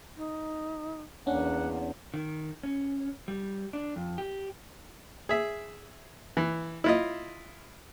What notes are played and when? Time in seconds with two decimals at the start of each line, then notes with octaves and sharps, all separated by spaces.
0.17 D#4
1.27 E2 A#3 C#4 D4 F#5
2.14 D#3
2.63 C#4
3.28 G3
3.73 D4
3.96 F2
4.18 G4
5.29 G#4 E5
6.37 E3
6.84 E4 F4 D#5